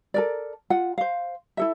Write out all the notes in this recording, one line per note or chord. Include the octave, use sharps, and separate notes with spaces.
A4 A#4 D5
F4 F#5
C5 F5
E4 A4 E5